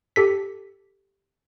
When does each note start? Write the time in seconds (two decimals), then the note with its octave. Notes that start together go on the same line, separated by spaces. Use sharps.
0.16 G4 A4 B6